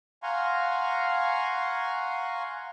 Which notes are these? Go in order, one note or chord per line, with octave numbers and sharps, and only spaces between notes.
F5 F#5 G#5 A#5 C6 C#6